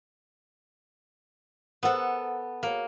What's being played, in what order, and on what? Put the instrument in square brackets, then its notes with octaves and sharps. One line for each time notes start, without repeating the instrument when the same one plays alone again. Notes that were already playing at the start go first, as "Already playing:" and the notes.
[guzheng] B3 A4 [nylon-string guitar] A#4 C5 F#5
[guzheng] A#3 [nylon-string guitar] F#4 C#5